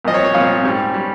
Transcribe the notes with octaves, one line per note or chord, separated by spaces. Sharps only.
C2 A#2 F3 D#5
C#5
C#5
C2 A#2 F3 F5
G#2 G3 C#4
G3 C#4